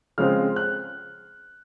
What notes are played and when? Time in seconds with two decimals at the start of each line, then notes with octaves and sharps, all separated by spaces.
0.18 C#3 F3 G#3 C4 F6
0.56 F#6